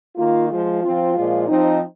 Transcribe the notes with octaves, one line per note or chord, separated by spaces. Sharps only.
D#3 A#3 F4
F3 G#3 F4
F3 C4 F4
A#2 F3 G#3 F4
F3 C4 D#4